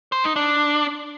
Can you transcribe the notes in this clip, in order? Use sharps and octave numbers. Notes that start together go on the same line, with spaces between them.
C5
D#4
D4